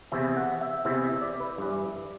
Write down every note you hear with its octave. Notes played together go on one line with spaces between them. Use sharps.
E2 C3 E3 E5
F#5
E5
E2 C3 E3 E5
E5
D5
B4
G2 E3